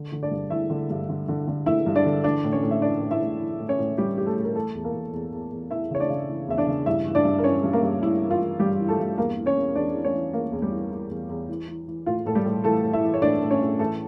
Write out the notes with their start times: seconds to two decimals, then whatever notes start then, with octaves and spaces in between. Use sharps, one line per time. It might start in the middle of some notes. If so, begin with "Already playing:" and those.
Already playing: D3
0.12 D3
0.23 D4 D5
0.31 G2
0.50 D3 E4 E5
0.70 D3
0.90 G2
1.09 D3
1.28 D3
1.47 D3
1.66 D3 E4 E5
1.86 G2
1.95 D4 D5
2.05 D3
2.24 E3 D4 D5
2.44 A2
2.53 C#4 C#5
2.63 A2
2.71 E5
2.82 E3 D4 D5
3.01 A2
3.11 E4 E5
3.21 A2
3.40 E3
3.59 A2
3.68 C#4 C#5
3.78 A2
3.97 A2 G3 G4
4.18 E3 G4
4.26 A3 A4
4.37 A2
4.44 A#4
4.55 E3 A3 A4
4.75 E2
4.84 A#3 A#4
4.94 E2
5.13 E2
5.33 E2
5.51 E2
5.71 E3 E4 E5
5.91 C#3 C#5
6.00 D4 D5
6.09 C#3
6.29 E3
6.48 E2 E5
6.58 D4 D5
6.67 C#3
6.86 G2 E4 E5
7.06 E3
7.15 D4 D5
7.25 G2
7.39 A#4
7.44 E3 C#4 C#5
7.63 G2
7.73 A#3 A#4
7.83 G2
8.02 G2 E4
8.21 E3
8.31 F4
8.40 E3
8.59 G2 G3 G4
8.80 E3
8.88 A3 A4
8.99 G2
9.18 E2 A#3 A#4
9.37 E3
9.46 C#4 C#5
9.57 E2
9.75 E2 D4 D5
9.94 E3
10.05 C#4 C#5
10.14 E3
10.33 E3 A#3 A#4
10.52 E2
10.62 G3 G4
10.71 E3
10.91 E3
11.10 E2
11.29 E2
11.48 E3
11.68 E3
11.88 E3
12.06 A2 F4
12.26 A2 A4
12.35 G3 G4
12.45 A2
12.64 E3 A3 A4
12.84 A2
12.93 E4 E5
13.04 E3
13.14 C#5
13.22 A2 D4 D5
13.42 A2
13.51 C#4 C#5
13.61 A2
13.79 E3 A3 A4